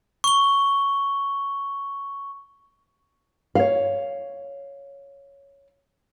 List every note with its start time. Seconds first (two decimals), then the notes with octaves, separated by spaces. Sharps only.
0.24 C#6 G7
3.55 C#5 F5